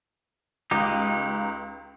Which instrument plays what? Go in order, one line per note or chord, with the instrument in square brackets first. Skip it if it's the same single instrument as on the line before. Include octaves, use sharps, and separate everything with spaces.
[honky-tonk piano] C#2 F5 [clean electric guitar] D#4 G4